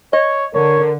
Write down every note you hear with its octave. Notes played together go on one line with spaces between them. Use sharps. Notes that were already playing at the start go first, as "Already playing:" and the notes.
C#5 D#5
D3 A#4 C#5